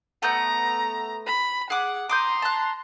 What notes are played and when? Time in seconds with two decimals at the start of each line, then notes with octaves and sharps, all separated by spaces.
0.23 A3 B3 A#5 G6
1.27 B5
1.70 G#4 F#5 D6
2.09 A#5 C6 D6 D#6 G6
2.42 A5 F#6